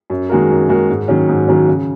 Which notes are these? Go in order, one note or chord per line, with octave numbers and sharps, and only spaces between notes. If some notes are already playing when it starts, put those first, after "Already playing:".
F#2
D#3 G#3 F#4 A#4
F#2
D#3 G#3 F#4 A#4
G#2
D#3 F#3 C#4
G#2
D#3 F#3 C#4
C#3